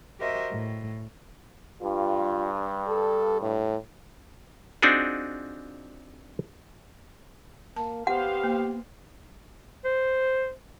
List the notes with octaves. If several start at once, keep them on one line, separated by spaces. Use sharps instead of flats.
F#4 G4 A#4 C5 D#5 E5
A2
G2 F4
A4
A2
C4 D4 D#4 F4 F#4 G#4
A#3 A5
B3 G4 C5 F5 F#5
A#3
C5